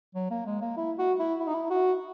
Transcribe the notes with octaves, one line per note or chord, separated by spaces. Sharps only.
F#3
A#3
G#3
A#3
E4
F#4
E4
E4
D#4
E4
F#4